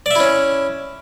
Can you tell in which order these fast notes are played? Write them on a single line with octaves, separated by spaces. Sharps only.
D5 E5 E4 C#4